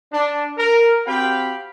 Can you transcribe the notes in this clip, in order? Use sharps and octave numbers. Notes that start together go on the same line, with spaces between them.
D4
A#4
C4 F#4 G4 F5 G5 B5